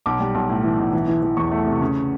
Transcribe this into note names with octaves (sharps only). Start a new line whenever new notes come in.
B1 D6
G3
B1
A2
E3
B1
E3
E3
E3
E2 C#6
A3
C3
C#3